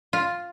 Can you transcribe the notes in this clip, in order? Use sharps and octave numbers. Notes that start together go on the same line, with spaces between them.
F4